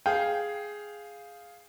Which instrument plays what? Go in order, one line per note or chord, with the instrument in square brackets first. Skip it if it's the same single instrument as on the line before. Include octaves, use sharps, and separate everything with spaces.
[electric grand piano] G#4 F5 [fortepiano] G5